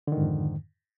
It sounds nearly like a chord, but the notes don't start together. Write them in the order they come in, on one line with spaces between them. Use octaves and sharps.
D3 D#3 G#2 F2